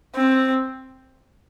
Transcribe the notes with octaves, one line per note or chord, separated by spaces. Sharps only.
C4